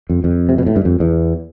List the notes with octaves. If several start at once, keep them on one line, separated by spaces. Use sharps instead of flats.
F2
F2
C3
B2
A2
G2
F2
E2